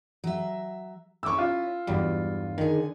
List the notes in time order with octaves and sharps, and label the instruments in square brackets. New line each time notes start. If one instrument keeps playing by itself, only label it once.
[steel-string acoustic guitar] F#3 E5
[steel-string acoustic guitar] C#4 E4 [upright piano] C#6 D6 E6
[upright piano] F4
[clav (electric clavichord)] E2 F#3 G3 [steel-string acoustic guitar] G2
[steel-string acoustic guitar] D3 G#4 [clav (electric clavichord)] D#3